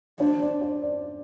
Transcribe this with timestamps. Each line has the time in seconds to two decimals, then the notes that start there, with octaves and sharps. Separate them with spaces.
0.20 D4 C5
0.41 D5
0.61 C5
0.82 D5